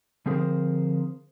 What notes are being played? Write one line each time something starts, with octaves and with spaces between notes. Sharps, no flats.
D3 F3 C4 G#4 A#4 C5